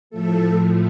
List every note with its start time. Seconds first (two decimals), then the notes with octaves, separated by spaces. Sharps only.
0.10 A2 F3 A3 A4